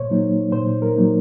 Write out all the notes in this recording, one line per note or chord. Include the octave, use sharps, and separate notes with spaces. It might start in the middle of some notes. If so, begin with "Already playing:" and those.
Already playing: A#2 C5 C#5
F#3 A#3 D#4
A#2 C5
A#4
F#3 A#3 D#4